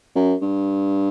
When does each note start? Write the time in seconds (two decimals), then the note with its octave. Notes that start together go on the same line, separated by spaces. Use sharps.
0.15 F#2
0.42 G2